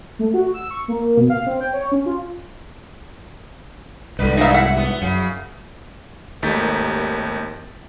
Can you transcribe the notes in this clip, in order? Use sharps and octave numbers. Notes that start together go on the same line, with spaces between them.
A3
F#4
E6
C#6
A#3
B2
F5
C4
G5
C#5
C#4
F4
C2 G#2 D3 B4
G2 A#2 C#3 D#4 E5
E4 E5 F#5
B3
F#2 C#3
G#1 D#2 A3 D#4 A6 B6